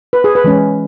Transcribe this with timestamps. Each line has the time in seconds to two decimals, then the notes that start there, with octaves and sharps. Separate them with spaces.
0.13 B4
0.24 G#4
0.35 B4
0.44 E3 G#3 C#4